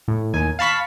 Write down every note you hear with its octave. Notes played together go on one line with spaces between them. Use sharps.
A2
D#2 G#5
F5 A5 B5 C#6 B6